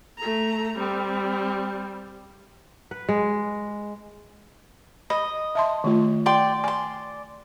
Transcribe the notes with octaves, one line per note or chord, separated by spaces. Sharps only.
A3 A#5
G3 C4
B4
G#3
D#5 B5
E5 A5 C6
D#3 A3 F4
D5 G5 C6
D5 G#5 C6